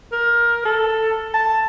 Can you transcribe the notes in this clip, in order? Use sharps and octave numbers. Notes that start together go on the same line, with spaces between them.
A#4
A4
A5